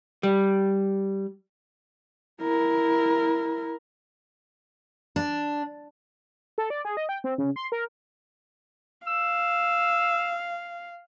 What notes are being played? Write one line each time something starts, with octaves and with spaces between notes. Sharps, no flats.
G3
E4 A#4
D4
A4
D5
G#4
D#5
G5
C4
C#3
C6
A#4
F5 E6